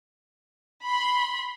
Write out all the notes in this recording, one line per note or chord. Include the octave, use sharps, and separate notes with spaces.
B5 C6